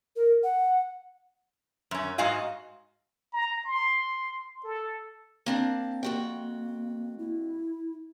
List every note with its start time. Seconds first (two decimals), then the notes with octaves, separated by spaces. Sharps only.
0.16 A#4
0.44 F#5
1.91 F#2 C#4
2.18 G#2 F#4 D#5 F5 G#5
3.33 A#5
3.65 C6
4.64 A4
5.46 A#3 C4 D4
6.03 F2 A#3 F#4 G5
7.19 E4